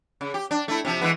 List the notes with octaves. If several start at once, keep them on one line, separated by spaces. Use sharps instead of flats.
C#3
G4
D4
A3 E4
C3 F3
E3 G#3 B3